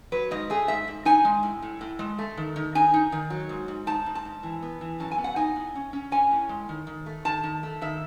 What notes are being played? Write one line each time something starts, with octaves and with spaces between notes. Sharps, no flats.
F#3 B4
G#2 D#5
A3 G#4
G#2 E5
G#2
D#4 G#5
G#3
A2
A2
A2
G#3
A3
D#3
D#3
D#4 G#5
D#4
D#3
F#3
G#2
G#2
D#4 A5
G#2
A5
G#2
E3
B3
E3
F#2 A5
G#5
B3
F#5
D#4 G#5
A2
C#4
C#4
C#4 G#5
A2
G#3
D#3
D#3
A3
D#3 A5
D#3
A3
D#3 E5